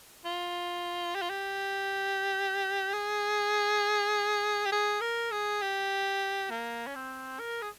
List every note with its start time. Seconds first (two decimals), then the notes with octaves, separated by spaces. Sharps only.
0.25 F4
1.15 G4
1.22 F4
1.30 G4
2.93 G#4
4.66 G4
4.72 G#4
5.01 A#4
5.31 G#4
5.62 G4
6.50 A#3
6.87 C#4
6.95 C4
7.40 A#4
7.62 G#4